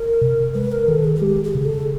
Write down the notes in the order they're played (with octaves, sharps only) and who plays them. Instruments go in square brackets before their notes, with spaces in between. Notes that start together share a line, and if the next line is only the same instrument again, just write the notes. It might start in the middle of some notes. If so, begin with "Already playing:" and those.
Already playing: [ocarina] A#4
[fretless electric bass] C3
[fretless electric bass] G#3 [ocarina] B4
[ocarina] A#4
[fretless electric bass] D#3 [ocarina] A4
[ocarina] G#4
G#4
[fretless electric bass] G#3 [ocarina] G4
[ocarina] G#4
[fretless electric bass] C#3
[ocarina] A4